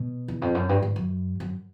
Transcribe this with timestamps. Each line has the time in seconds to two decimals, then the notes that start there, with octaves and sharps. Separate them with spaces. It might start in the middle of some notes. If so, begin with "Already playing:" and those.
Already playing: B2
0.28 E2
0.42 F2
0.55 F#2
0.69 G2
0.82 G#2
0.96 F#2
1.40 F#2